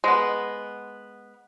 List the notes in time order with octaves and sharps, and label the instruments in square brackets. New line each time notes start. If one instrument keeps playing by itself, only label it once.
[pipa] G#3 B3